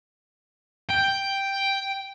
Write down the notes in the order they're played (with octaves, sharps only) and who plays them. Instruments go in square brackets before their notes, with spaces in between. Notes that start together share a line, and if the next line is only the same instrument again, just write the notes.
[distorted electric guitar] G5